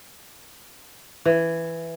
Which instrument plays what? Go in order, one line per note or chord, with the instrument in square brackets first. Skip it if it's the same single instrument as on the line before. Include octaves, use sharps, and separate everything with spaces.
[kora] E3